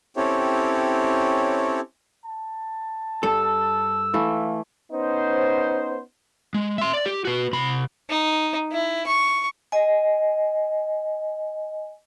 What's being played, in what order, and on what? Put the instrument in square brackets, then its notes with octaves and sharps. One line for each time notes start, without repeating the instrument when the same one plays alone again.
[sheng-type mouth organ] C4 C#4 E4 G4 A4 C#5
[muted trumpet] A5
[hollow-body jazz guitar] G2 A4 [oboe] E6
[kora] E3 A3 [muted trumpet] F5
[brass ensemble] B3 C#4 D#4 C5
[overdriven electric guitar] G#3
E5 C6
D5
G4
F#4 B4
C3 B5
[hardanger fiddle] D#4
E4
C#6
[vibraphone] D#5 G#5